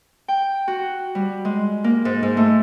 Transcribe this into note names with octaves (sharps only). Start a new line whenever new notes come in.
G5
F#4
G3
G#3
A#3
G#2
G#2
A3